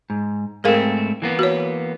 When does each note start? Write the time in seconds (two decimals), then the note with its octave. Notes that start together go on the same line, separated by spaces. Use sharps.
0.10 G#2
0.64 G#2 A3 C4 G#4 A#4 F5
1.22 E3 A#3 B3
1.39 F#4 C#5